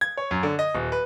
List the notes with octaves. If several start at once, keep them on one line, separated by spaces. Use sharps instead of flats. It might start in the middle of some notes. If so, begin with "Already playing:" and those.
G#6
C#5
F#2
D3
D#5
D#1
B4